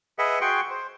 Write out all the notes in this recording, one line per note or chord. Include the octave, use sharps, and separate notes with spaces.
G#4 B4 D#5 E5 F#5
F#4 G#4 G5 C6 C#6
C5